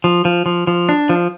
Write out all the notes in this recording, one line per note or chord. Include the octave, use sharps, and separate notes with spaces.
F3
F3
F3
F3
D4
F3